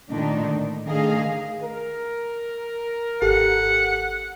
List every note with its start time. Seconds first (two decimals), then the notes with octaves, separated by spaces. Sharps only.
0.10 A#2 D3 D#3 A3 D4 D#4
0.51 A2
0.87 D3 D#3 A3 G#4 D#5 F5
1.62 A#4
3.22 G#1 G4 A4 F#5